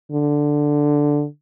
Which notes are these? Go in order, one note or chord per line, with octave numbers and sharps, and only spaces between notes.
D3